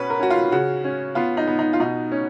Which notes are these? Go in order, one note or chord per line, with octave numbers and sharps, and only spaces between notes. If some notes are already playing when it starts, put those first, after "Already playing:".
Already playing: B2 C#4 B4
A#4
C#4 F#4
F4
C#3 F#4
C#4
B3 F4
D#4
B3
D#4
F4
B2 D#4
C#4